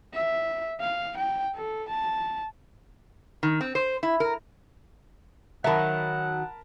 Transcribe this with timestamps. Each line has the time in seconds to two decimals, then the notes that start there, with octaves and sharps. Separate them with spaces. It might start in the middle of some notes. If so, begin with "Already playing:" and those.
0.14 E5
0.80 F5
1.17 G5
1.55 A4
1.88 A5
3.43 D#3
3.61 C4
3.75 C5
4.03 E4
4.20 A#4
5.64 D#3 F#3 A#4 E5 F#5 A5 B5